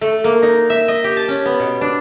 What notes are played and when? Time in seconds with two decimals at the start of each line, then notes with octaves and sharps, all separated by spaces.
0.01 A3
0.24 A#3
0.42 D#4
0.70 E5
0.88 D#5
1.04 G4
1.17 A5
1.28 C#4
1.46 B3
1.60 B2
1.81 D4